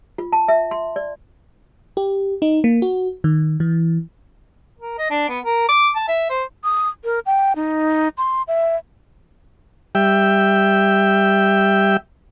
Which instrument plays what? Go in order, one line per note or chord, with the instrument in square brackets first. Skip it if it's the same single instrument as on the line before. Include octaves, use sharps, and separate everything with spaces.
[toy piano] F4
A5
E5
C6
D5
[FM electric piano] G4
D#4
A#3
F#4
D#3
E3
[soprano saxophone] A#4
D#5
D4
B3
A#4
D6
A5
E5
C5
[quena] D#6
A#4
G5
D#4
C6
E5
[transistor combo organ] G3 E5 G5